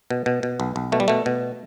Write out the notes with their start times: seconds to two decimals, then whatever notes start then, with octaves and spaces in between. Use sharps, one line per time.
0.10 B2
0.26 B2
0.43 B2
0.60 B1
0.76 B1
0.92 B2 A3
1.00 G3
1.08 B2 A3
1.26 B2